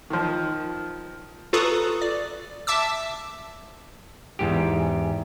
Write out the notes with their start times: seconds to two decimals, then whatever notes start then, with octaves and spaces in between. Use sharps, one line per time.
0.10 D#3 F3
1.53 F4 A4 B4 A#5 C#6 D#6
2.02 D5
2.67 E5 A5 D6 E6
4.39 E2 G#2 G4